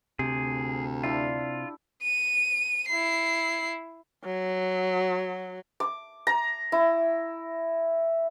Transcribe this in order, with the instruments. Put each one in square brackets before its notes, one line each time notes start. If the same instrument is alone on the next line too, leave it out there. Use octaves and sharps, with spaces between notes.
[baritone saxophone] D2 [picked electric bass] C3 [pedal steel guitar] G#4
[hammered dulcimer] D4 E4 G4 [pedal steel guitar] F4
[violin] D#7
E4 C7
[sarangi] F#3
[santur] D6
A#5
E4